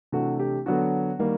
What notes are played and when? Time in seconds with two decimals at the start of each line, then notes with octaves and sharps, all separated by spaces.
0.12 C3 E3 A3 D4 F#4
0.39 G4
0.66 D3 F#3 B3 D4 F#4
1.19 D#3 G3 A#3